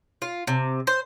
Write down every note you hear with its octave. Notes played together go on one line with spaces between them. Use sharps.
F4
C3
C5